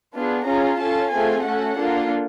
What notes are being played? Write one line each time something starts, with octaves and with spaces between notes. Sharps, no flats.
B3 D4 F4 G#4
C#4 F4 G#4 A#5
C#4 F4 A4 A5
A3 C4 F4 G#4 G#5
A3 C#4 F#4 A4 F#5
A#3 D4 F4 A4